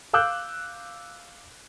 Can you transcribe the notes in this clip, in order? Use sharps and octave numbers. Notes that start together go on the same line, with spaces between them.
F5 D6 E6 F#6 G6